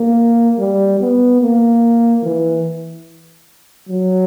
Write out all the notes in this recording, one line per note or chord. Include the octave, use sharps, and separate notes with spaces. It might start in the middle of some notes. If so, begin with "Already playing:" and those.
Already playing: A#3
G3
B3
A#3
E3
F#3